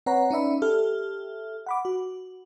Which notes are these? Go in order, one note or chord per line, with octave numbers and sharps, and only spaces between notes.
C4 B4 C#5 F#5 A#5
C#4 D#4 D5 E5 B5
G4 A4 E5 F6
F#5 B5 D6
F#4